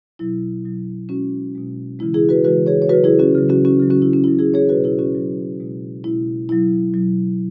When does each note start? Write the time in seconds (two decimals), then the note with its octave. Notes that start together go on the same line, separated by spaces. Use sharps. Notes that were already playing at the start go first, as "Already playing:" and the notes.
0.19 B2 F#3 E4
0.64 B2 F#3
1.09 B2 G#3 C#4 F#4
1.55 B2 G#3
1.99 C#3 E3 G#3 E4
2.14 E4 G#4
2.29 F#4 B4
2.44 C#3 E3 G#3 F#4 B4
2.66 G#4 C#5
2.82 C#5
2.89 C#3 F#3 F#4 B4
3.04 E4 G#4
3.19 C#4 F#4
3.35 C#3 F#3
3.49 C#4 F#4
3.65 C#4 F#4
3.80 C#3 F#3
3.90 C#4 F#4
4.02 E4
4.13 C#4
4.24 C#3 F#3 E4
4.39 E4 G#4
4.54 G#4 C#5
4.69 B2 F#3 F#4 B4
4.84 E4 G#4
4.99 C#4 F#4
5.14 B2 F#3
5.60 B2 G#3
6.04 B2 G#3 E4
6.49 B2 F#3 E4
6.94 B2 F#3